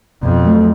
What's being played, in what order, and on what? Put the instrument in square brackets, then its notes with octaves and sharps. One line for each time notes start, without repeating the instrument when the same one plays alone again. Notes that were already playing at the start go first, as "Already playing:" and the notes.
[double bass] F2 [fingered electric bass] B2
[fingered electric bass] F#3 A3